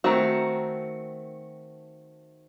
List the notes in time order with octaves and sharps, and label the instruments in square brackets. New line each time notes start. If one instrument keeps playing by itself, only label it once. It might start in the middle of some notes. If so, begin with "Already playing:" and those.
[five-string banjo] D#3 A3 C4 F#4